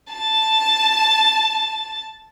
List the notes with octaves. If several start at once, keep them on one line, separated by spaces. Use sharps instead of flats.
A5 A6